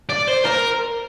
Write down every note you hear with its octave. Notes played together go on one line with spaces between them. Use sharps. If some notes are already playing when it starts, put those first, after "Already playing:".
D5
C5
A#4